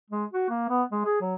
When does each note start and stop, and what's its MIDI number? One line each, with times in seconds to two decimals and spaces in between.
0.10 0.25 56
0.33 0.45 66
0.50 0.68 58
0.69 0.83 59
0.92 1.01 56
1.05 1.21 68
1.21 1.35 54